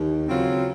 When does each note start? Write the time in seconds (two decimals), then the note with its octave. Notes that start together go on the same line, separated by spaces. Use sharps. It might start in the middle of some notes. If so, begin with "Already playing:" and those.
Already playing: D#2
0.28 C#3 F#3 C4 F4